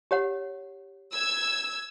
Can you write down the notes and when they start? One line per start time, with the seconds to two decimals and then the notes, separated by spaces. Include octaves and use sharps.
0.11 G4 C#5 F#5
1.13 E6 G#6